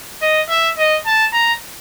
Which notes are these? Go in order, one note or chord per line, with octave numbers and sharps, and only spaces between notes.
D#5
E5
D#5
A5
A#5